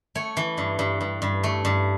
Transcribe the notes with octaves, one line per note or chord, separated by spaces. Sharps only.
A3 C#5
E3
G2
G2
G2
G2
A3
G2